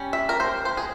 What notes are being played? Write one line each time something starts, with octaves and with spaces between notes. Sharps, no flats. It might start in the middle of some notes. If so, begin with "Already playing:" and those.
Already playing: G3 C#4
E5
A#4
C5
C5
G#4